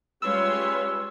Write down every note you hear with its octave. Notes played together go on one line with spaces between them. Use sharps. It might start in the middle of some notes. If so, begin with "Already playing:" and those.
G3 G#3 C#4 F4 B4 C#5 C6 E6